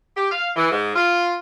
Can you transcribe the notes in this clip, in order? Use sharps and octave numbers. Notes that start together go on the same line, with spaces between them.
G4
F5
E3
G#2
F4